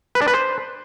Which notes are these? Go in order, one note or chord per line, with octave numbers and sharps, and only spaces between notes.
B4
D4
B4
C5